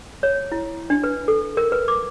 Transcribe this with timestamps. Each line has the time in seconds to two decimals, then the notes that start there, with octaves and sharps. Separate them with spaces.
0.23 C#5
0.52 E4
0.90 D4
1.04 B4
1.28 A4
1.57 A#4
1.72 B4
1.88 D6